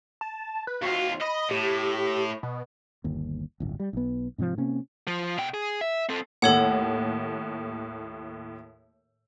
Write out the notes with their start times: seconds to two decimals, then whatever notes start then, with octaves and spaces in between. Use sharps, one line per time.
0.21 A5
0.67 B4
0.82 D#2 F4 F#4
1.21 D#5 B5
1.51 A2 G4
2.43 B2
3.04 G1 D#2
3.60 D1 G1
3.80 G3
3.93 B1 B3
4.38 G#2 C3 D#3 F3
4.58 C3 A#3 C#4
5.07 F3
5.38 B2 G5
5.54 G#4
5.81 E5
6.09 C4 A4
6.42 D#2 A2 A4 C#5 F#5